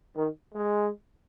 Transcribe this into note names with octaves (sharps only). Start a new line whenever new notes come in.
D#3
G#3